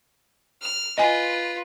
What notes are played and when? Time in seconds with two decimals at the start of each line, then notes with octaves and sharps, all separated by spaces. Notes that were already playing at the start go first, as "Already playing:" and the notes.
0.62 F6
0.98 F4 B4 D#5 G#5